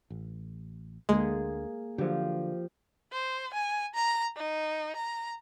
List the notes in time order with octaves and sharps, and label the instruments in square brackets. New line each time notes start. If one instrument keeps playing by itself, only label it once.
[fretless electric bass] A1
[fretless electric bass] D2 D3 [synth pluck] G#3 [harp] A#3 G#4
[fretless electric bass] D3 F#3 [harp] F3 G4
[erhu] C5
G#5
A#5
D#4
A#5